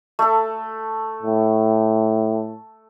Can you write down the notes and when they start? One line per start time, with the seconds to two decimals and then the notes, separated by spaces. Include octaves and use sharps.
0.19 A3 A4
1.22 A2